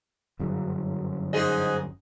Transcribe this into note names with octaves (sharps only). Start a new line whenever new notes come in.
G1 F#2 C#3
G#2 G#4 D#5